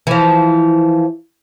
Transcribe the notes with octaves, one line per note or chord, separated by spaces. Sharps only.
E3 F3